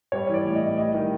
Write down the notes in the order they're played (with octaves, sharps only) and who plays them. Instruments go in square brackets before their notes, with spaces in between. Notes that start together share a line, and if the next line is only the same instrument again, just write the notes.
[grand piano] G3 C#5
E3 D5
A2
D#5
A2
G3 D#5
D#3